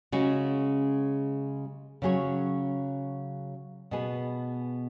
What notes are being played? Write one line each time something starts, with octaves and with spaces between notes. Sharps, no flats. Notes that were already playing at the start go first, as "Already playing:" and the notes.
C#3 G#3 C#4 F#4
C#3 F#3 C#4 G#4 C#5
B2 B3 G#4 B4